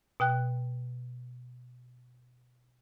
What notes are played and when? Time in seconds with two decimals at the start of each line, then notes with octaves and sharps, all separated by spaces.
0.20 B2 G5 F#6